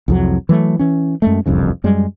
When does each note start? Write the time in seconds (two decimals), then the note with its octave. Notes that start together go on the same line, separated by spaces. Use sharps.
0.08 C2 F2 F#3
0.49 E3 F#3 A3
0.79 E3 C#4
1.22 F#2 G#3 A3
1.46 E1 C2 F2 C#3
1.84 F#2 G3 G#3